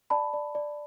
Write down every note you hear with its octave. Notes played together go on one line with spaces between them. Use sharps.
D5 A5 B5
D5
D5